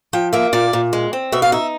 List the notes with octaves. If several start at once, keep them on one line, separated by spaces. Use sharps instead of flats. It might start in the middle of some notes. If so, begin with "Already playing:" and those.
F3 G5
A#3 E5
A#2 D5
A#2
G#3
C4
B2 E5
F5
D#4 E5